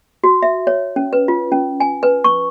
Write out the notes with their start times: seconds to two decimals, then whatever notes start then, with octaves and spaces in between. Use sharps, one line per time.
0.24 F#4
0.43 E5
0.67 C#5
0.96 C#4
1.13 B4
1.28 F4
1.52 C#4
1.80 G#5
2.03 B4
2.24 C#6